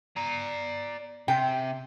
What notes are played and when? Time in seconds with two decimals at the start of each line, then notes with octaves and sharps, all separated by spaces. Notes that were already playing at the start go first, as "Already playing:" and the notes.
0.17 D5 A#5
1.28 C3 G5